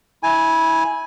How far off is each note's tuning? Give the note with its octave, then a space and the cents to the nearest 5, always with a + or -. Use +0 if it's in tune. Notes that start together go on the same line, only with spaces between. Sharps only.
E4 -20 G#5 +0